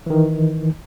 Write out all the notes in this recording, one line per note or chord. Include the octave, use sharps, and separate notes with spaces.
D#3 E3